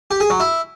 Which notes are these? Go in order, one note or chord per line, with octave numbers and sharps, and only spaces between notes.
G4
G#4
F#3
E4